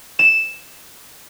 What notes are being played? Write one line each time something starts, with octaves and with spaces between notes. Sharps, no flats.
E7